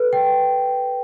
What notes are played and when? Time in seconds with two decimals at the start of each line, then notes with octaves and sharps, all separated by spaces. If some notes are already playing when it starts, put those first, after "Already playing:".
Already playing: A4 B4
0.13 G5